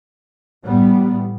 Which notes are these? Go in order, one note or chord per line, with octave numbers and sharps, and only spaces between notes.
A1 A2 G3 B3